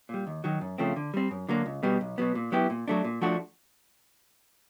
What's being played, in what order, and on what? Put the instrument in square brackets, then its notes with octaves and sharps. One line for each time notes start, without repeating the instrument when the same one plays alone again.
[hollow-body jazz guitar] A#2 G3
D#2
D#3 F#3
F#2
C#3 F3 A3 C4
D3
G3 C4
F#2
D3 F#3 A#3
C#2
B2 G3 B3
B1
B2 F#3 B3
A#2
F#3 B3 E4 G4
A#2
F#3 A3 D4
A#2
F3 A3 D4 F#4